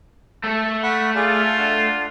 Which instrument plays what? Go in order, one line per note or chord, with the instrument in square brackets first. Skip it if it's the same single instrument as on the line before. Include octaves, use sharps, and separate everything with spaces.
[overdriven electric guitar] A3 A4
[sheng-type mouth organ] F#5 B5 C#6
[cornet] F4 [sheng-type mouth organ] G#4 D5 F5
[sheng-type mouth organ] D4 F#5